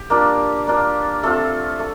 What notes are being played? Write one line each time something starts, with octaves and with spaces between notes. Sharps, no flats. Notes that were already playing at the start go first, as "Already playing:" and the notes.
Already playing: G4
A#3 D4 F4
A#3 D4 F4
A3 C4 F4 A4
A3